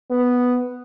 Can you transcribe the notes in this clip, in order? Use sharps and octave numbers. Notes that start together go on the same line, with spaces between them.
B3